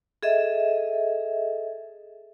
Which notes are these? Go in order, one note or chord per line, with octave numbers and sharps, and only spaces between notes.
G#4 A4 D#5 E5